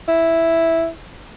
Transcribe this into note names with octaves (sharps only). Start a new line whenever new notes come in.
E4